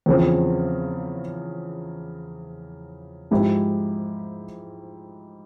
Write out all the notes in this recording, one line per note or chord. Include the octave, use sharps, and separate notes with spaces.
E2 C#3 F3 C4
G#2 F3 G#3 E4 G4